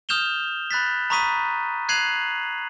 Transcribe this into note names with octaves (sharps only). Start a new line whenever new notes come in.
D#6 F6 G6 E7 F7 G7
B5 F#6 A6 B6
A#5 B5 C#6 D#6 B6 D#7
F#6 G#6 C7 D#7 F7 F#7